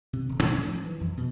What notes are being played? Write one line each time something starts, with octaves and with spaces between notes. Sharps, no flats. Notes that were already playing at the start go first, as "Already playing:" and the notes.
C3
D#1
G#2
C#4
F3
E3
F2
B2